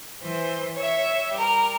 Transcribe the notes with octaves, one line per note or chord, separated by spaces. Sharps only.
E3 C5
C#5 E5
G3 A#4